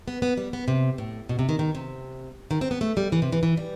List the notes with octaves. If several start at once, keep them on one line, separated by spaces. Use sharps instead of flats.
B3
B3
G3
B3
C3
A2
B2
C3
D#3
D#3
C3
D#3
C4
B3
A3
G3
E3
C3
E3
E3
G3